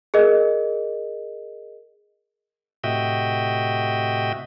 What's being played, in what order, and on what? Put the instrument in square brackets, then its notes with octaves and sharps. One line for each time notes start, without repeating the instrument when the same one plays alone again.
[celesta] G#4 A#4 D#5
[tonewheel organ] A2 C3 F#4 D#5 E5 G5